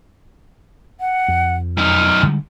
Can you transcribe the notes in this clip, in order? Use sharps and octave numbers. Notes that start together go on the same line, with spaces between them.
F#5
F2
F#2 D#4 F6
D3 G3 G#3